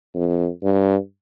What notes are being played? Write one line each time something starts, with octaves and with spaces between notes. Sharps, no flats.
F2
G2